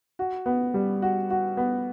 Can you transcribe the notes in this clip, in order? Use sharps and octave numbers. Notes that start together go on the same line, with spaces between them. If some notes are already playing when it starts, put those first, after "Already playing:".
F#4
B3
G3
F#4
F#4
B3